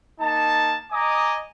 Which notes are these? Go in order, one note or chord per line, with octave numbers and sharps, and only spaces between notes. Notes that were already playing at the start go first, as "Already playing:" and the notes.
A#3 D#4 A5
D#5 G#5 A#5 D6 D#6